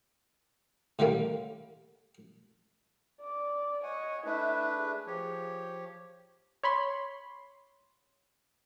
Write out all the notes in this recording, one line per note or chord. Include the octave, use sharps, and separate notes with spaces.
A2 D3 D#3 G3 A#3
D5
C#5 D#5 F#5 G#5
A3 D4 E4 B4
G#4
F3 G4 C#5
C#5 B5 C6